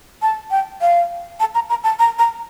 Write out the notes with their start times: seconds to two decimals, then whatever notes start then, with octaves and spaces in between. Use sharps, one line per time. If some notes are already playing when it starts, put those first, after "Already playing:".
0.22 A5
0.51 G5
0.81 F5
1.40 A5
1.55 A#5
1.70 A#5
1.84 A5
1.99 A#5
2.19 A#5